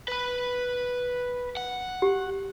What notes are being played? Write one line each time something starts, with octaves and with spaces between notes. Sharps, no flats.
B4 B5
F#5
G4